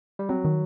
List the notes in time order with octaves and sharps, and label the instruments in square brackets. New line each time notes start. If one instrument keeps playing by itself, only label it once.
[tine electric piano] G3
[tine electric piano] F#3 [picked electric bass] C4
[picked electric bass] D#3